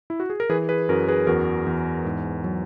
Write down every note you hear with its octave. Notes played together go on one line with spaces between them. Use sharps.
E4
F#4
G#4
A#4
E3 G#4 B4
G#4 B4
F#2 F#4 A#4
G#4 B4
E2 F#4 A#4
E2
G#2
F#3